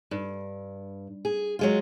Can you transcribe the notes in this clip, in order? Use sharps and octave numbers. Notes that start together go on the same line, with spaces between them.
G2
G#4
F#3 G#3 F4